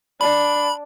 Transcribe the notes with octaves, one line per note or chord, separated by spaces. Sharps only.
D4 B5